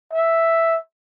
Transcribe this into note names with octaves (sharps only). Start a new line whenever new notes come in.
E5